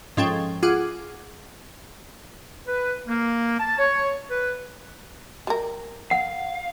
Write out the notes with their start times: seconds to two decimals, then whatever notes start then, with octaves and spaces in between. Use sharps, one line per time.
0.17 G#2 F3 C#4 A4 G5
0.63 F4 G#4 F#5 D6
2.68 B4
3.07 A#3
3.59 A5
3.78 C#5
4.31 B4
5.47 G3 A#4
6.11 F5 F#5